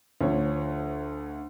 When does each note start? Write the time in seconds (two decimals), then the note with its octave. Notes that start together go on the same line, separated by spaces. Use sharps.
0.21 D2 F3 C#5